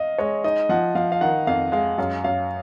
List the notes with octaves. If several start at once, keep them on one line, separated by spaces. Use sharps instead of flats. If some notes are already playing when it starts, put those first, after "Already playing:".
Already playing: D#5 F5
G#3 C#5
D#4 D#5
F3 F#5
F3 F5
F5
D#3 F#5
F2 F5
G#3 F5
F#2 F5
F#2 F5